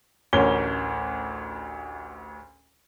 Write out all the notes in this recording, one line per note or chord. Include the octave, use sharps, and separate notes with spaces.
A1 D2 C#4 A#4 G7